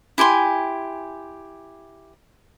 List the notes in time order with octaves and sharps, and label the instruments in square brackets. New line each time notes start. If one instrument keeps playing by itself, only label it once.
[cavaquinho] E4 G4 G#5 C6